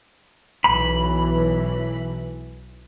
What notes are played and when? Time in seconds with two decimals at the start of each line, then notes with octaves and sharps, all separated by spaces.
0.64 B1 E3 B5